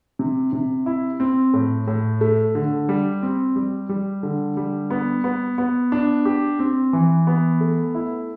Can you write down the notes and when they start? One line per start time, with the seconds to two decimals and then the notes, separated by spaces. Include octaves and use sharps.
0.19 C3
0.53 C3
0.86 E4
1.20 C4
1.54 A2
1.87 A2
2.21 A3
2.55 D3
2.89 G3
3.23 C4
3.56 G3
3.89 G3
4.23 D3
4.57 G3
4.90 B3
5.24 B3
5.58 B3
5.92 D4
6.25 G4
6.59 C4
6.93 E3
7.27 B3
7.61 A3
7.95 E4